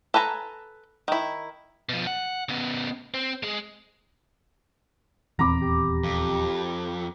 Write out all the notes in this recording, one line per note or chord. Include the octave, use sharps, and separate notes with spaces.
A4 B4 G#5 A#5
D#3 E4
B2 F3
F#5
C#3 B3
C4
G#3 G#4
D#1 E2 C4 A#5 B5 D6
G4
F2